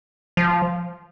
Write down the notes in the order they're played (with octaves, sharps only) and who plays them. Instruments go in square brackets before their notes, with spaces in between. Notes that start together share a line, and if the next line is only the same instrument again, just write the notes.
[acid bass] F3